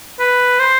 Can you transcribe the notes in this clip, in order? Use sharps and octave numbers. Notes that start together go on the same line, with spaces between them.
B4
C5